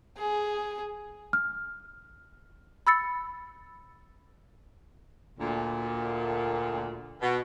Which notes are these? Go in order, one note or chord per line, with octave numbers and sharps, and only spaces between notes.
G#4
F6
B5 E6 A6 C#7
D2 A#2
B2